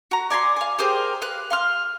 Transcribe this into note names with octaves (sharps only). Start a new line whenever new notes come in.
F#4 A#5
D5 G#5 A#5 C6
F5 G#5
G4 G#4 A#4 C5
B4 F5 F#6
F5 C6 F6